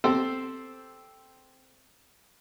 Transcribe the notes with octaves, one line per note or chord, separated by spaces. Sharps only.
C4 G4 A4 C5